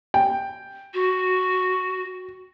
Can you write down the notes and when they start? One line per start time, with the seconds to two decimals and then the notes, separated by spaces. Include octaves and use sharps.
0.14 G5
0.94 F#4